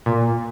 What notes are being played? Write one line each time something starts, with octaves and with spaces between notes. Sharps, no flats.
A#2